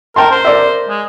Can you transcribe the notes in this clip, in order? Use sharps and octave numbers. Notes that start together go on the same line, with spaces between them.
A#4 G5 A5 C6
C5
A#4 D5 E5
G#3